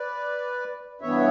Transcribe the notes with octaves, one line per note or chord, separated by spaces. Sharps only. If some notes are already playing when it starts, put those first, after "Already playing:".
Already playing: B4 D5
G2 E3 B3 C#5 E5